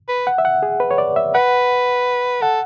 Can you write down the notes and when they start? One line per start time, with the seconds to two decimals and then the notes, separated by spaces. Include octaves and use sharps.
0.09 B4
0.27 F#5
0.38 E5
0.45 F#5
0.63 G#4
0.80 B4
0.91 C#5
0.98 D5
1.16 E5
1.34 B4 F#5
2.41 A4 F#5